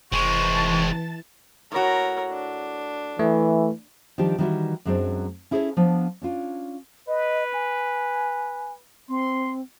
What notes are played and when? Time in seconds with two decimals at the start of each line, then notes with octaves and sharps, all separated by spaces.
0.12 F1 E3 G#3 C4 A5 C#6 A6
1.72 A2 F#4 A#4 C#5
2.31 D4
3.19 E3 A3
4.18 D#3 F3 G3 D4 G4
4.38 D#3 E3 G3 D4 E4 F#4
4.85 F#2 F#3 G#3 B3 C4 D4
5.51 C#4 E4 G#4 A4 B4 C#5
5.77 F3 B3 D4
6.22 C#4 D4 F4
7.08 B4 D#5
7.54 G#5
9.09 C4 C6